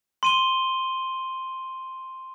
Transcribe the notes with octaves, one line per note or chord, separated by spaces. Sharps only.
C6 D#7 G7